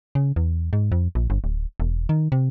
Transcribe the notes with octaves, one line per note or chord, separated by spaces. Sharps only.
C#3
E2
G#2
F2
A#1
G1
D1
E1
D#3
C3